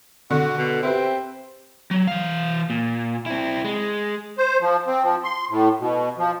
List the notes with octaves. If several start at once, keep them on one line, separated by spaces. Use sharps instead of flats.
D3 F#4
B2
C4 G4 B4 E5
F#3
E3 F5
A#2
C4 E4
G#3
C5
F3
C4
F3
C6
A2
B2
F3